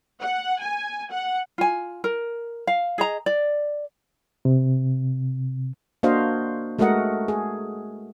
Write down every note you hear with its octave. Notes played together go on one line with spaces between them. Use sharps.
F#5
G#5
F#5
F4 G#5
A#4
F5
G#4 D#5 A#5
D5
C3
A#3 D4 F#4 C5 D#5 F5
G#3 A3 F#4 A#4 D#5 F#5
G#4